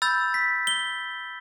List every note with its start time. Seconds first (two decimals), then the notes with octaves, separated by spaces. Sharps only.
0.02 B5 E6 G6 A6
0.34 B6
0.67 G7